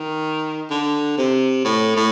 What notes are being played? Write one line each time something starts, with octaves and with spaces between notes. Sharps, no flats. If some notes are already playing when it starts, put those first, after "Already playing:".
Already playing: D#3
D3
C3
A2
A2